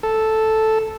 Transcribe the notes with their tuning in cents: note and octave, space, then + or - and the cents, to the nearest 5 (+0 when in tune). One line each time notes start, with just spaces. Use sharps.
A4 +0